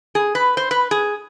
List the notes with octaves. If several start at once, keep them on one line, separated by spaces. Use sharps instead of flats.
G#4
B4
C5
B4
G#4